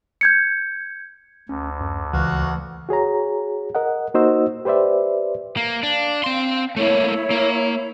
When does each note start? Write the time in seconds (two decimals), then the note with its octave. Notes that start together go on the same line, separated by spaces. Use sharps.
0.21 G6 G#6 C#7
1.49 D2 C#4
1.81 F#2
2.13 C#2 E3 F#4 F5 F#5
2.89 F#4 G#4 C#5 A#5
3.75 A#4 D#5 F#5
4.14 A#3 D#4 F#4 C5 D#5 E6
4.65 G4 B4 C5 D5 E5
5.57 A#3
5.83 D4 F5
6.24 C4 C6
6.77 A3 A#3 E4 C#5
7.31 A#3